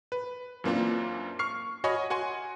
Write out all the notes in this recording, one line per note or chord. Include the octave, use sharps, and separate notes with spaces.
B4
F#2 E3 A#3 C4 D4 F4
C#6 F6 C7
F#4 C#5 D#5 G#5 B5 C#6
F#4 F#5 G#5 C6